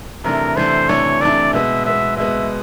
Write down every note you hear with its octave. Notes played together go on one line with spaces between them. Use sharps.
C3 E3 A3 D4 A#4
C3 E3 A3 D4 C5
C3 E3 A3 D4 C#5
C3 E3 A3 D4 D5
B2 G#3 B3 E5
B2 G#3 B3 E5
B2 G#3 B3 E5